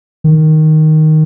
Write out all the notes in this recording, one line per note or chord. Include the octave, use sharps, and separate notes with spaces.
D#3